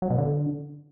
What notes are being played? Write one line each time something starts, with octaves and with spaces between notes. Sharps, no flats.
F#3
B2
D3